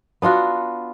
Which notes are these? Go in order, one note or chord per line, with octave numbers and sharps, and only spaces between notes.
B3 D4 F4 F#4